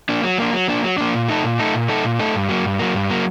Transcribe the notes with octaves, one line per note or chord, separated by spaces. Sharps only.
A#3 D4
F#3
A#3 D4
F#3
A#3 D4
F#3
A#3 D4
A#2
A3 D#4 A4
A#2
A3 D#4 A4
A#2
A3 D#4 A4
A#2
A3 D#4 A4
G2
F#3 A#3
G2
F#3 A#3
G2
F#3 A#3